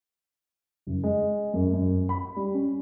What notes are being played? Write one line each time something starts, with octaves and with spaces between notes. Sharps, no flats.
F#1
G#3
F#2
F#2
B5
G3
C#4